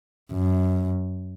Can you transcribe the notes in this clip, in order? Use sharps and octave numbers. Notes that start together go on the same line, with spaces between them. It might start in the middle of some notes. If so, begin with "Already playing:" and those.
F#2